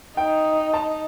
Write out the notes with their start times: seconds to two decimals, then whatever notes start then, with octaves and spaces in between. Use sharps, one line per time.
0.17 D#4 G5
0.74 A5